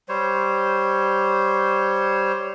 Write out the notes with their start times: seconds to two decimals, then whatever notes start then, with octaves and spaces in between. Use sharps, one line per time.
0.09 G3 C5 C#5